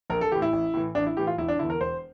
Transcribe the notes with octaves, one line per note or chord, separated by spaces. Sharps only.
A#1 A#4
A4
A2 E3 G4
E4
A1
A2 E3
A1 D4
E4
A2 E3 G4
F4
E1 E4
D4
E2 D3 E4
A#4
E1 C5